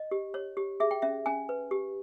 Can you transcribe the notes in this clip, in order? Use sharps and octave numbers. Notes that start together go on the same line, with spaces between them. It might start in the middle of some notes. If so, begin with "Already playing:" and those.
Already playing: D#5
G4
C#5
G4
G#4 E5
G5
C#4 E5
C#4 G#5
B4
G4